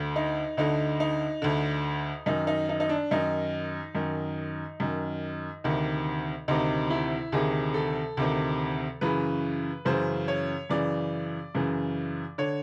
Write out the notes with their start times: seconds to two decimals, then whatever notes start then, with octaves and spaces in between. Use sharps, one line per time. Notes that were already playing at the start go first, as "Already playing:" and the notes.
Already playing: D2 D3
0.16 D#4
0.57 D2 D3 D#4
1.00 D#4
1.42 D2 D3
2.26 F#2 D#3 D#4
2.47 D#4
2.69 D#4
2.80 D#4
2.89 D4
3.11 F#2 D#3 D#4
3.95 F#2 D#3
4.80 F#2 D#3
5.64 D2 C3 D#3
6.48 D2 C3 D#3 D#4
6.90 E4
7.32 D2 C3 D#3 G#4
7.74 A4
8.17 D2 C3 D#3
9.01 F#2 C#3 E3 B4
9.85 F#2 C#3 E3 C5
10.28 C#5
10.70 F#2 C#3 E3 D5
11.55 F#2 C#3 E3
12.38 D3 C#5